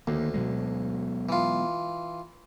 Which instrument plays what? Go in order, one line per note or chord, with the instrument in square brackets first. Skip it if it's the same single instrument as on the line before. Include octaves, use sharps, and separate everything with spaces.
[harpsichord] D2 [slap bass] D#3 A#3
[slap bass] B2 F#3 G#3
[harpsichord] E3 F4